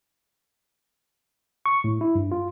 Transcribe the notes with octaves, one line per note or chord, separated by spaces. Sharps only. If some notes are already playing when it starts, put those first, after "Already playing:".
C#6
A2
E4
G2
F4